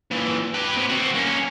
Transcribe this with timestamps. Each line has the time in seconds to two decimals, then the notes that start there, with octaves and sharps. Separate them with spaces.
0.11 A#2 E3
0.54 G4 B4
0.76 C3 B3
0.89 C4 F#4
1.14 A#3 C#4